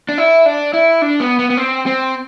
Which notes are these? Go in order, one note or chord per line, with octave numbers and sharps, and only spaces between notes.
D4
E4
D4
E4
D4
B3
B3
B3
C4
C4